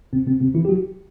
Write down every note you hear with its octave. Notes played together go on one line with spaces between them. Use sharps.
C3 C4
C3 C4
C3 C4
E3 E4
G4
F#3 F#4